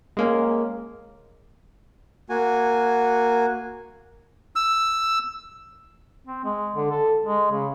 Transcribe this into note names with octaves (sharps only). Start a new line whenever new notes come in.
G#3 A#3 C#4
A#3 F#4 G#5
E6
C4
G#3
D3
A4
G#3
C#3